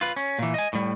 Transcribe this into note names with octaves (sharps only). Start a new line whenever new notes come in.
F4 B4
C#4
A#2 E3
D#5 G#5
A2 G3